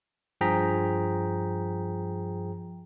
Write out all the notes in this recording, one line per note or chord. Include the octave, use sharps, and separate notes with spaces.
G2 F3 G#4 G5 A#5 B6